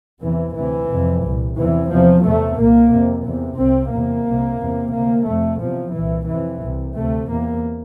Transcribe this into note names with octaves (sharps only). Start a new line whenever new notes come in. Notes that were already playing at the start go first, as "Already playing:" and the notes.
E2 C3 E3
D2 C3 E3
F2 C3
C2 A#2
E2 C3 E3
E2 C3 F3
E2 C3 A3
C2 A#2 A#3
F2 C3
E2 C3
C2 C3 C4
E2 C3 A#3
C2 C3
E2 C3
D2 C3 A#3
F2 C3 A3
E2 C3 F3
C2 A#2 E3
F2 C3 E3
C2 C3
D2 C3 A3
E2 C3 A#3